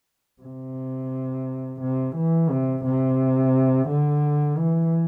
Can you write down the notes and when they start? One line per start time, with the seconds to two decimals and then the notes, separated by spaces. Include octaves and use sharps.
0.42 C3
1.81 C3
2.16 E3
2.50 C3
2.84 C3
3.89 D3
4.58 E3